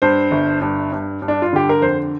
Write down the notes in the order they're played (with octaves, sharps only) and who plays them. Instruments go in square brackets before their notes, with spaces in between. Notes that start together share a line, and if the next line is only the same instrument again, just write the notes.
[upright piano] G2 C5
G1
G2
G2
G2
D4
F4
D3 G4
A#4
F2 C5